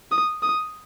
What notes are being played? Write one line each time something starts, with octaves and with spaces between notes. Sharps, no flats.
D#6
D#6